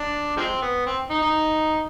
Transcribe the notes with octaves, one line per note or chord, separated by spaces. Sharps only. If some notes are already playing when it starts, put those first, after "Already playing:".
Already playing: D4
F3 G#3 C4
B3
C4
D#4
D#4